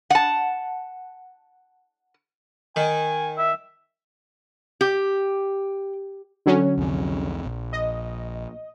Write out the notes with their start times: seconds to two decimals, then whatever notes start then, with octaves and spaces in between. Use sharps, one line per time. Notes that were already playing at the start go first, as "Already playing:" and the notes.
0.10 F#5 A5
2.76 D#3 G#5
3.38 E5
4.81 G4
6.46 D3 F#3 C#4
6.77 C2 F2 C4
7.46 A#1
7.73 D#5